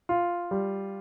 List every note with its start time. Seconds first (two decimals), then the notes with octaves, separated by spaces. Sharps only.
0.09 F4
0.51 G3